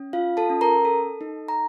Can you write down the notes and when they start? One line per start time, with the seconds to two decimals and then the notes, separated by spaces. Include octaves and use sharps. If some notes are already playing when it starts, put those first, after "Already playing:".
Already playing: C#4
0.13 F4 F5
0.37 A4 A5
0.50 C#4
0.61 A#4 A#5
0.85 A4
1.21 D#4
1.48 A#5